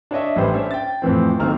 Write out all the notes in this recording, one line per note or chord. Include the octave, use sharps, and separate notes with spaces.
D4 C#5 D#5 E5
A1 G3 B4 C5
C#4 D4 C5 E5
G5 A6
F2 A2 E3 C4
B1 D#3 A#3 C4 F6